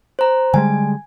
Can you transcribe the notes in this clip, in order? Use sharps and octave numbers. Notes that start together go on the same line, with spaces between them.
C5 A#5
D3 G3 G#3 G#5